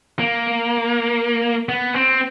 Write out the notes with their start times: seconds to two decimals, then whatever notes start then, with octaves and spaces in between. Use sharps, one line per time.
0.19 A#3
1.69 B3
1.94 C4